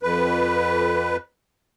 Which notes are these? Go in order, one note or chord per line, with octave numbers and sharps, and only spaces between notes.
F2 B4